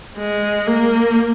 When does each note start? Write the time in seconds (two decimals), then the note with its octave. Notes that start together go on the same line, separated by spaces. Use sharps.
0.18 G#3
0.68 A#3